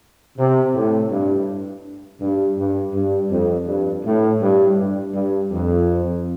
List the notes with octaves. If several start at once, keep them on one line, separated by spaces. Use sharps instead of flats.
C3
A2
G2
G2
G2
G2
F2
G2
A2
G2
G2
G2
F2